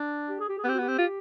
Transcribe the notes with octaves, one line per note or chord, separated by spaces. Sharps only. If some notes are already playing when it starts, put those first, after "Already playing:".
Already playing: D4
G4
G#4
G4
G#4
B3 G4
C4
F#4
B3
G4
C4
F4